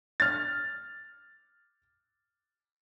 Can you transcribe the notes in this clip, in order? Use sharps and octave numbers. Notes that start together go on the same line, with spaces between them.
F6 A6